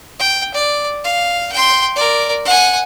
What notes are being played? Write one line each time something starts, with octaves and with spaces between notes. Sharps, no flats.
G5
D5
F5
G5 C6
A#4 D5
F#5 G#5